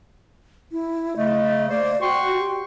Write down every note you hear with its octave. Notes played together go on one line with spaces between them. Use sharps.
E4
C#3 A3 D#5
A#3 C5 D5
F#4 G5 C6 C#6
G4